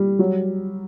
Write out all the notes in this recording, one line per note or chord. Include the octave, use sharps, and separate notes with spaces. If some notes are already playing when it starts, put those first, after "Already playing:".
Already playing: G3
F#3